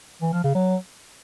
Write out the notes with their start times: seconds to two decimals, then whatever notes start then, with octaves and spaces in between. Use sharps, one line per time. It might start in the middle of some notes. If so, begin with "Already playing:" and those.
0.22 E3
0.33 F3
0.44 C#3
0.55 F#3